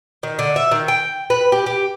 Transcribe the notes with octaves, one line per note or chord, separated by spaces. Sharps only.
D#3
D3
E5
D#3
G5
B4
G4
G4